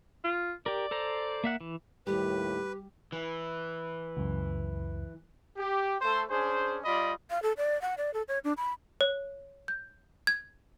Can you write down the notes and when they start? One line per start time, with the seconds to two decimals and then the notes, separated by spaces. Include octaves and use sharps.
0.24 F4
0.66 G4 A#4 D5
0.91 A4 C5 A#5
1.44 A#3 E5 F#5
1.61 E3
2.07 D#2 A2 G3 G4 B4
3.12 E3
4.17 C#2 F#2
5.57 G4
6.01 A3 A4 C5
6.30 C#4 D4 G#4 C5
6.85 G3 F4 D5 D#5 B5
7.30 F5
7.43 A4
7.57 D5
7.82 F#5
7.98 D5
8.14 A4
8.28 C#5
8.44 D4
8.57 B5
9.01 C#5
9.68 G6
10.27 G#6